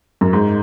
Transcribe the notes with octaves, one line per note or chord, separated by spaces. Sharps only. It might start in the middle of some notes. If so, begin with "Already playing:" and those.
F#2
G#2